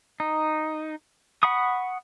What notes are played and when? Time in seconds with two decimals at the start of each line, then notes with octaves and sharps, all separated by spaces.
0.20 D#4
1.43 F#5 B5 C#6 D#6